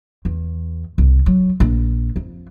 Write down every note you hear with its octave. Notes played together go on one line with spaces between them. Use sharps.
E2
C2
F#3
A#1
F2